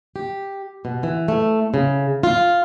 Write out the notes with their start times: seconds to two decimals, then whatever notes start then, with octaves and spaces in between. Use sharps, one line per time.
0.16 G4
0.85 B2
1.03 E3
1.28 A3
1.74 C#3
2.23 F4